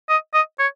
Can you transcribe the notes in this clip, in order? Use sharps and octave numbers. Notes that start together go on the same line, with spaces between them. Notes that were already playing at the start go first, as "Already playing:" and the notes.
D#5
D#5
C#5